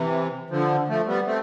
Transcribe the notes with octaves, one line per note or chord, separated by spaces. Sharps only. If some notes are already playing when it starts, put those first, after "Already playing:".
Already playing: C3 E3
D3 F3
F3 A3
G3 B3
A3 C4